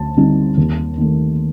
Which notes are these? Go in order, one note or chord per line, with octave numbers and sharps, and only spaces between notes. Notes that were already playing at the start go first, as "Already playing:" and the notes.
Already playing: D2 A5
D3 G3 C4 D#4
D#2
D#3 A3